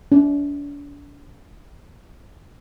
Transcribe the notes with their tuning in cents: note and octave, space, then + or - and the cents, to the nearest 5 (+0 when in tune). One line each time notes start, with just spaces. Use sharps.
D4 -40